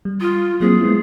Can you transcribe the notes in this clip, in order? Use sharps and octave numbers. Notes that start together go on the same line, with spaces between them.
G3
F4 D#6 F6
F#3 A#3 C4 G#4
G#3 B3 E4